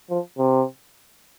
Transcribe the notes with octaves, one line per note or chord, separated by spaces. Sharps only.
F3
C3